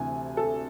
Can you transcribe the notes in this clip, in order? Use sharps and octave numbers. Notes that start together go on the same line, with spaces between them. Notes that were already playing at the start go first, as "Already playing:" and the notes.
Already playing: D2 C3 E3 G#5
A4